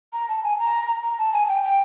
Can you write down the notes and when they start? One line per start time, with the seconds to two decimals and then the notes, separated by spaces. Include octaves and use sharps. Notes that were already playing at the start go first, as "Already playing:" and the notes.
0.13 A#5
0.28 A5
0.43 G#5
0.59 A#5
1.03 A#5
1.19 A5
1.33 G#5
1.48 G5
1.63 G5